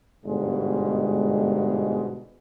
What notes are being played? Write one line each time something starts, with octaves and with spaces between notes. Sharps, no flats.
G1 G#2 B2 G#3